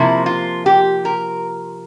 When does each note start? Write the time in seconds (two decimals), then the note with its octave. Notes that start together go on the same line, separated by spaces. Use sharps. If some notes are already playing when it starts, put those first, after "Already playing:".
Already playing: C3 F3 A#3 E4
0.26 F4
0.66 G4
1.05 A#4